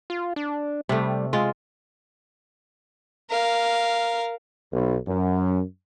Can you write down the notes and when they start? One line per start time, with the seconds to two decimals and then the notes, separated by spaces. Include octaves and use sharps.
0.10 F4
0.36 D4
0.89 C3 G3 A3
1.33 G#3 F4
3.30 A#4 F5
4.72 B1
5.08 F#2